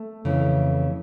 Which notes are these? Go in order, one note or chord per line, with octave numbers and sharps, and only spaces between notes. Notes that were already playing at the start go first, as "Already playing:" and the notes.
Already playing: A3
F2 C#3 E3